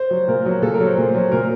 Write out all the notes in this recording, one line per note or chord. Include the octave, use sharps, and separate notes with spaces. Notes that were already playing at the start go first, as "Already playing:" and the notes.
Already playing: C5
F#3
A#2 A#4
F#3
A#2 A4
A#4
F#3
C5
A#2
F#3
A#2 A#4